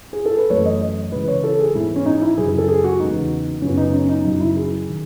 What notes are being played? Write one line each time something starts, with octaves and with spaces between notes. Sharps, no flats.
G#4
A4
B4
F#2 E3 A3 C#5
D#5
D#5
C#3 E3 G#3 B4
C#5
A4
G#4
G#2 E3 G#3 B3 E4
C#4
D#4
E4
F#2 C#3 F#3 G#4
G#4
A4
G#4
F#4
E2 C#3 G#3 B3 D#4
F#2 C#3 F#3 B3 C#4
D#4
C#4
D#4
F#2 C#3 F#3 D#4
E4
G#4
D#3